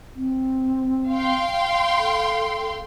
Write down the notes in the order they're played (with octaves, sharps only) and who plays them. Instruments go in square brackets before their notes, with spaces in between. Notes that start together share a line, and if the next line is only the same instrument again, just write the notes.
[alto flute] C4
[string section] F5 G5 C6
[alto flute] A4